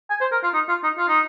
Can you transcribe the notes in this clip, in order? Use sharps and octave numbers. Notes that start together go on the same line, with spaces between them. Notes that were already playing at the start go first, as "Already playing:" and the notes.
G#5
C5
A#4
F4
D#4
F4
D#4
F4
D#4